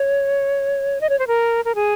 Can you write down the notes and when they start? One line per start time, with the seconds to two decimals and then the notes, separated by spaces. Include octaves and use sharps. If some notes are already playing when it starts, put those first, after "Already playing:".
Already playing: C#5
1.01 D#5
1.09 C#5
1.19 C5
1.27 A#4
1.65 A#4
1.75 G#4